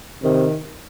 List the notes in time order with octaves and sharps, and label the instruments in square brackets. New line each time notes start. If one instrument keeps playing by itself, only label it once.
[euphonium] C3 [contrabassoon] D#3